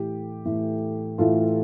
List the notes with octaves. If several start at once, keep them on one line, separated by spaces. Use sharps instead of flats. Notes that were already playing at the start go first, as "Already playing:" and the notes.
Already playing: A2 E3 A3 G4
A2 E3 A3
A2 E3 A3 F4 A4